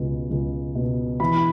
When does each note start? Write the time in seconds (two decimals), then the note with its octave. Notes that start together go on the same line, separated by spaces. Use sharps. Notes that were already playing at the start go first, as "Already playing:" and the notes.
Already playing: C#2 B2
0.31 C#2
0.75 B2
1.20 E3 B5